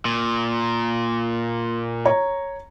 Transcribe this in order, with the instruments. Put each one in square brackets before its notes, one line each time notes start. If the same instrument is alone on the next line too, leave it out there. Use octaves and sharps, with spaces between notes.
[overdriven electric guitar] A#2
[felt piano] C#5 A#5